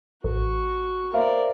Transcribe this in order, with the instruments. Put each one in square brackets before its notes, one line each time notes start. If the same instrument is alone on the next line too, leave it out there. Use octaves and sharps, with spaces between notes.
[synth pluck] A1 [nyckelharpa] F#4 C#6
[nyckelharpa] A#4 D5 [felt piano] C5 E5 F5